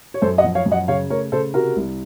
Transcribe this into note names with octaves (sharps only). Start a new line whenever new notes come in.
C#5
F#2 A4 C5
D#5 F#5
F3
C#5 F5
F#2
D#5 F#5
C#3 C#5 F5
A3 A#4 C#5
C#3 A4 C5
C3 F#4 A#4
C2